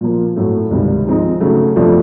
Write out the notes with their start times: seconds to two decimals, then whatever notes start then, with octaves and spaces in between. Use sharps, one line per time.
0.01 A#2 F3 A#3
0.36 A2 F#3 A3
0.71 C#2 C3 D#3 G3
1.06 G#2 F3 G#3 C4 D#4
1.40 C#3 F#3 A3
1.76 F2 C3 F3 A3 D4